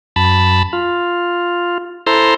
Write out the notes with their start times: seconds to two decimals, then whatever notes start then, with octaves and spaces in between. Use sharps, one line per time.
0.16 F#2 A5 B5
0.73 F4
2.07 E4 A4 C5 A#5 C6